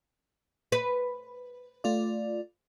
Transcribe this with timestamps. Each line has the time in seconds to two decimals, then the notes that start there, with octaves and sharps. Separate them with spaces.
0.72 B4
1.84 A3 F4 D5